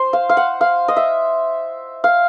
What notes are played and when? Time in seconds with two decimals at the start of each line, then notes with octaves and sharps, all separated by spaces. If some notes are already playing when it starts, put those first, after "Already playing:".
Already playing: C5
0.13 F5
0.29 F5
0.37 F#5
0.61 F5
0.88 D#5
0.96 E5
2.04 F5